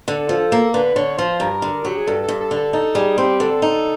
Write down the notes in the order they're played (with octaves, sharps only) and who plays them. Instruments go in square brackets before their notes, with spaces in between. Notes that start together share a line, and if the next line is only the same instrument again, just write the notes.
[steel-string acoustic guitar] D3 [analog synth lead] A4
[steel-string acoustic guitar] F3
A#3
[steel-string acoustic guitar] D3 [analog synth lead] B4
[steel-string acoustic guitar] D3 [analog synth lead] C#5
[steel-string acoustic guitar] F3 [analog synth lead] C5
[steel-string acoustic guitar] G2 [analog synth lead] A#4
[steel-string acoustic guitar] D3
[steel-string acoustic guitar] F#3 [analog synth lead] G4
[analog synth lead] G#4
[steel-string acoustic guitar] G2 [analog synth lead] A4
[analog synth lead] A4
[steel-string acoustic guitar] G2
[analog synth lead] A4
[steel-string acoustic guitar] D3
[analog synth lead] A4
[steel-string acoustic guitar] D#4 [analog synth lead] A4
[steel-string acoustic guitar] G3 [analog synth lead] G#4
[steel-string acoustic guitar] C4 [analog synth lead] G4
[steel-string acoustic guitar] D3 [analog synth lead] A4
[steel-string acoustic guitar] D#4